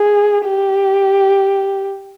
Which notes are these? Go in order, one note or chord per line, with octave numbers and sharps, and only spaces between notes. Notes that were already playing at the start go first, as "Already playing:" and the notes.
Already playing: G#4
G4